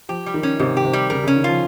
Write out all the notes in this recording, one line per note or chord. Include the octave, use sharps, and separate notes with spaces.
F3 G4
G3
D#3
C#4
G#2 C3
G4
C3
G3
C#3 A#4
C#3
C#4
D#3
F3 F4